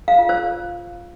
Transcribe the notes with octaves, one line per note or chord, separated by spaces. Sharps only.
F5
F4
C5